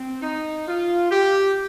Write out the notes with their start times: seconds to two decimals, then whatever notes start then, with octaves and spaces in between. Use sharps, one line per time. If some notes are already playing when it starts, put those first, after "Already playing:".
Already playing: C4
0.22 D#4
0.68 F4
1.11 G4